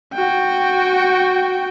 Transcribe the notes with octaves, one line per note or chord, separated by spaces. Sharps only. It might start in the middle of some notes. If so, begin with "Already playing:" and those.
F#4 G5